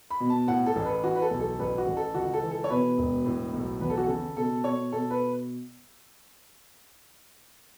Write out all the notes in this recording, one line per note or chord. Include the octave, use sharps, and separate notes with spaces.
B5
B2
A5
A2 F#5
A4
A1
B4
E3 F#4
B4
A4
B1
A4
A1 B4
F#4
A1
A4
C#2 F#4
A4
E3
A4
C#5
B2 B4
E1
A2
B1
E2 B4
A4
F#4
C#3 A4
B2 A4
B2 C#5
B2 A4
B4